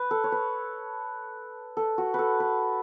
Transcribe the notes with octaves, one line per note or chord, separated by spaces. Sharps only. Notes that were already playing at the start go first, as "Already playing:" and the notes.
Already playing: B4
A4
C#5
B4
A4
F#4
A4 B4
B4